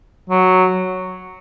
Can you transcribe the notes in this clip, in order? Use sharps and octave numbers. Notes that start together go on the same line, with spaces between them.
F#3